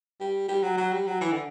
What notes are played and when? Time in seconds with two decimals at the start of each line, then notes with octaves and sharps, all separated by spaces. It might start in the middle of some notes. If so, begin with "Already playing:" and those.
0.20 G3
0.48 G3
0.63 F#3
0.77 F#3
0.93 G3
1.07 F#3
1.21 E3
1.32 D3